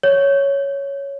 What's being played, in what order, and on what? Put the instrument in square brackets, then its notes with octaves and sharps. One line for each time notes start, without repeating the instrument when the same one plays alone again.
[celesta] C#5